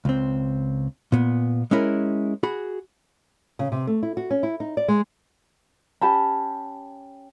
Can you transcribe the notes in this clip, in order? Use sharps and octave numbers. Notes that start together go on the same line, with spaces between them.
C#2 C4
A#2 B3
G#3 C#4 E4 A#4
F#4 G#4 B5
C#3
C3
A3
E4
F#4
C#4
E4
D#4
D5
G#3
C#4 G4 A5 B5